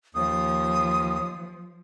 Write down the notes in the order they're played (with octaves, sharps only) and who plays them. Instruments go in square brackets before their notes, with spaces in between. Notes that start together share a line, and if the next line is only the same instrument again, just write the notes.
[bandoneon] D#2 [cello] F3 [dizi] D#6